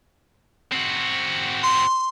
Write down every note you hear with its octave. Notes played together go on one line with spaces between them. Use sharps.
C4 F#4
C6